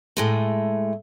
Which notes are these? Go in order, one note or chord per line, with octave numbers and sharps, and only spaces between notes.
A2 G#3 A3